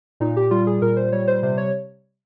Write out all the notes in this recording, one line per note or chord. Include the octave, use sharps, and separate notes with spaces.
A#2 D#4
G4
G3 F4
G#4
A#2 A#4
C5
G3 C#5
C5
C3 C5
C#5